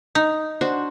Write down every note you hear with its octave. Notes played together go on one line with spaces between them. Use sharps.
D#4
D4 F#4 C5